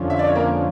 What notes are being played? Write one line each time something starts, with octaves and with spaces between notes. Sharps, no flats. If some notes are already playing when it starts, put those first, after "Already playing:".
Already playing: F2 D3 F3 C#4
E5
D5
C#5
A#3 A#4